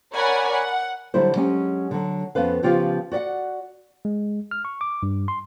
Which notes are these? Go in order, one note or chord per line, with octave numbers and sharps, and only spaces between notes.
A#4 C#5 D5 F#5 G#5 B5
F#5
D3 F#3 G3 E4 C5
F#3 G#3 C#4 G4 G#5
D3 F#3
F2 B3 C#4 B4 F5
C#3 F3 B3 F4 G4
F#4 D5 E5 F#5
G#3
F6
C#6
D6
G2
C6